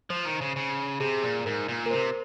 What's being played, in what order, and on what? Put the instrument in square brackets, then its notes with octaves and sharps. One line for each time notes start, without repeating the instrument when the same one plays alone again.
[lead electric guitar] F3 [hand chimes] C5
[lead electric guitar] D#3
C#3
C#3
[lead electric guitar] C3 [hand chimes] G#4
[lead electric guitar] A#2
[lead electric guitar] G#2 [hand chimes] A#4
[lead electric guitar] A#2
[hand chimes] A#4
[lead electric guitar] C3 [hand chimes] C5